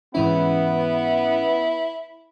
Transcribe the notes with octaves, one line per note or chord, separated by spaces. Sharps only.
G#2 E3 B3 C#4 E4